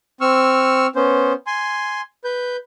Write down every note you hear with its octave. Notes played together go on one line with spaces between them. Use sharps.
C4 C#6 E6 F6
B3 C#4 C5
G#5 C6
B4 G6